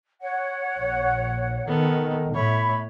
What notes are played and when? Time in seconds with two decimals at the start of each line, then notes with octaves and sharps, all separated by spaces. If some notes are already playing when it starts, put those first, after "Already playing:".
0.21 C#5 F#5
0.78 A#1
1.68 D#3 B3 A4
2.34 A2 C#5 E5 B5